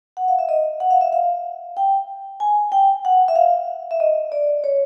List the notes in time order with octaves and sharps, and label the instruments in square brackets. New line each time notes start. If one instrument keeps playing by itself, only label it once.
[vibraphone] F#5
F5
E5
D#5
F#5
F5
E5
F5
G5
G#5
G5
F#5
E5
F5
E5
D#5
D5
C#5